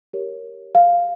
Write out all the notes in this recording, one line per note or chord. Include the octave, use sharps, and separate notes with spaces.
G4 A#4 C#5
F5